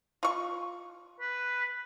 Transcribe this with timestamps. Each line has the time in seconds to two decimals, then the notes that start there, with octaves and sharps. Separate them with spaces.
0.23 F4 C#6
1.20 B4